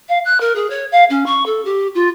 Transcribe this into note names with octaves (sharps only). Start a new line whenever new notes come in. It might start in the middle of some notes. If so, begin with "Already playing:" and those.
F5
F#6
A#4
G#4
C#5
F5
C#4
C#6
A4
G4
F4